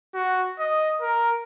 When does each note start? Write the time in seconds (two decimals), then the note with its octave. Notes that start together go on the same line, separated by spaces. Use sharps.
0.15 F#4
0.59 D#5
1.02 A#4